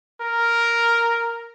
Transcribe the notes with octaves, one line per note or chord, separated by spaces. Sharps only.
A#4